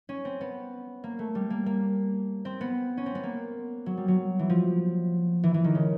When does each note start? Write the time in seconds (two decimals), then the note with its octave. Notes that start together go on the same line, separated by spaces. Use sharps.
0.09 C#4
0.25 C4
0.41 B3
1.04 A#3
1.19 A3
1.35 G3
1.50 A#3
1.66 A#3
2.45 C4
2.61 B3
2.97 C#4
3.06 C4
3.15 B3
3.23 A#3
3.86 F#3
3.97 G3
4.08 F#3
4.39 E3
4.50 F3
5.44 E3
5.54 E3
5.64 D#3
5.75 C#3